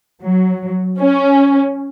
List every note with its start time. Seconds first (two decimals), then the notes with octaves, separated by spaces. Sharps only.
0.21 F#3
1.00 C#4